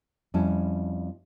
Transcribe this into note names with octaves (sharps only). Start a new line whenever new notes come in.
F2 G3 C#4 E4 A5